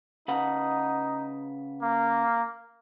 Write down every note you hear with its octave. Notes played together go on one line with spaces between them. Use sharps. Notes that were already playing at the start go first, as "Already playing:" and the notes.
C#3 D#4 B4 F#5
A#3